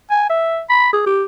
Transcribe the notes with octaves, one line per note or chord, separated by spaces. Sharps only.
G#5
E5
B5
G#4
G4